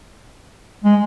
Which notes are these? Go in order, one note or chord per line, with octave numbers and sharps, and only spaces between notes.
G#3